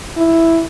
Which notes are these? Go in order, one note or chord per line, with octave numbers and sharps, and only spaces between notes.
E4